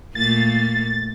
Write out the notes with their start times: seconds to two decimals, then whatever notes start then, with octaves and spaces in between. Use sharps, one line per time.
0.15 A#2 A3 A#3 A6